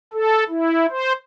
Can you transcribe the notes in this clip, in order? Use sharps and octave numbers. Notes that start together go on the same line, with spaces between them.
A4
E4
C5